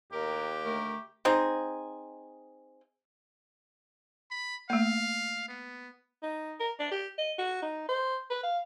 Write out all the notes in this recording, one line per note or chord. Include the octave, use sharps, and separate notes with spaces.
D#2 A2 G4 A#4
D3 A3 A#4
C4 D#4 G#4
B5
A3 A#3 F5
B3
D#4
A#4
D4
G4
D#5
F#4
D#4
C5
B4
F5